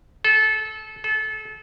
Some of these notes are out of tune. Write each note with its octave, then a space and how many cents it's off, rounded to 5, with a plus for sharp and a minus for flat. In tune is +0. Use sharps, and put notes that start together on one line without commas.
A4 -25
A4 -30